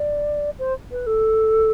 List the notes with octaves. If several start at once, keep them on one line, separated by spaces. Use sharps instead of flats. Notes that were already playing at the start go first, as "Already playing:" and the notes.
Already playing: D5
C5
B4
A4